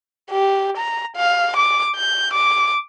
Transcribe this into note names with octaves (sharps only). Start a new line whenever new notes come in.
G4
A#5
F5
D6
G6
D6